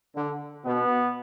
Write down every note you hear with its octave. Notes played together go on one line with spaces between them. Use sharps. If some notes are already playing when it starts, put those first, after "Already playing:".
D3
B2 B3